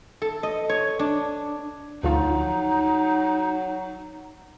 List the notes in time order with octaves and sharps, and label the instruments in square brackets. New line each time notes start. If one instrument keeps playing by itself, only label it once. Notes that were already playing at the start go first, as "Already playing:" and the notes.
[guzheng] A4
D#5
C#5
D4
[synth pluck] D2 F3 F4 [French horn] F#3 [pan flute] D#4